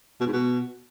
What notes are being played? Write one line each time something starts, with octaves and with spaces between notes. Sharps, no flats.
B2
G#2
B2